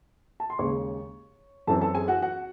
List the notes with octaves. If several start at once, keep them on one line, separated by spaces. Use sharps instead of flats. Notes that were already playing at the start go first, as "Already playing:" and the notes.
A5
C6
D#2 C#3 G#3 C#5 C#6
F#2 E3 C4 A4 A5
A4 A5
G#4 G#5
F#4 F#5
F#4 F#5